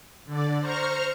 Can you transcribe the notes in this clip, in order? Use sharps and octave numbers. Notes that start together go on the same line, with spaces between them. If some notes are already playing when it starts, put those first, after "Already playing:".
D3 D5
C5 A#5 C#6 F6